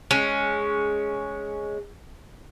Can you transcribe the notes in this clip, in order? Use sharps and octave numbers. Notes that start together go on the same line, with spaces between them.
G#3 C#4